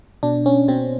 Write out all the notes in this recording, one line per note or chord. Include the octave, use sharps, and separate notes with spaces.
B2 D4
C#4
B2 C4